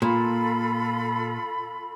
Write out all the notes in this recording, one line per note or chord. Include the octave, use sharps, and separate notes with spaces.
A#2 F4 A4 B5